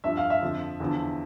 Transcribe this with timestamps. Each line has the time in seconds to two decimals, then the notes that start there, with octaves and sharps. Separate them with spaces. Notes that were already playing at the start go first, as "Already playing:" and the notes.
0.04 G2 F3 E5
0.17 F5
0.30 E5
0.42 F2 D3 F3
0.80 E2 D3 F3